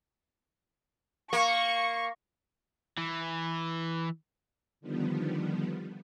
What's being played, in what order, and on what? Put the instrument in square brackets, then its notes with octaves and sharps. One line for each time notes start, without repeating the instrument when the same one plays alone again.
[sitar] A#3 [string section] C#6
[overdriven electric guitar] E3
[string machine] D3 D#3 F3 G3 B3